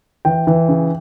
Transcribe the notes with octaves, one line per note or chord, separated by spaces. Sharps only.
E3 G5
E3
C#3